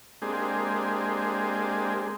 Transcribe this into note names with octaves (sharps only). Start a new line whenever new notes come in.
G#3 A#3 C4 D4 G4 G#4